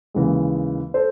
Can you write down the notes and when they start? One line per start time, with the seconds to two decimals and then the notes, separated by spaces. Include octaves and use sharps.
0.14 D#2 C#3 E3 G#3
0.94 A4 C5